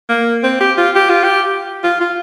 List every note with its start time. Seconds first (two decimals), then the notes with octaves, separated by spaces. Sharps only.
0.09 A#3
0.43 C4
0.60 G4
0.78 F4
0.95 G4
1.09 F4
1.24 G4
1.84 F4
2.01 F4